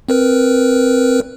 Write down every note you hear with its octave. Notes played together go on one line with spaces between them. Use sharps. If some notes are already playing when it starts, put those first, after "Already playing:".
C4 A#4 B4